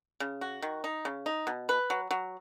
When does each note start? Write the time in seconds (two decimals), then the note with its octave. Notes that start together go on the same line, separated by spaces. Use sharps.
0.20 C#3
0.41 F#4
0.62 D#3
0.84 D#4
1.05 C#3
1.26 D#4
1.47 B2
1.69 B4
1.90 F#3
2.11 F#3